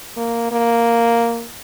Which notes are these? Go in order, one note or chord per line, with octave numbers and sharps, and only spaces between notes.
A#3
A#3